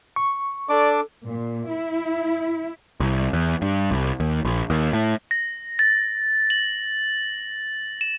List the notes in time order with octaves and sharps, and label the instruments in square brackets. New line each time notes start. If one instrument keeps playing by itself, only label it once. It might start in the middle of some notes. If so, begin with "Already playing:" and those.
[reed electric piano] C#6
[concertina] D4 D6 [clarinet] A4 [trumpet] D5
[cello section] A#2
E4
[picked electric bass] C2
E2
G2
C2
D#2
A#1
D#2
A2
[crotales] A#6
A6
F#7
E7